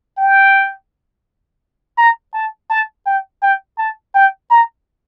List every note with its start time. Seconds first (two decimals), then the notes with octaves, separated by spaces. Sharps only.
0.18 G5
1.98 A#5
2.34 A5
2.70 A5
3.06 G5
3.42 G5
3.78 A5
4.15 G5
4.51 A#5